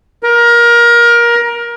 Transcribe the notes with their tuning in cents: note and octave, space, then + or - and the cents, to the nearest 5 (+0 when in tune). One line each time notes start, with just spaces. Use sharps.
A#4 +25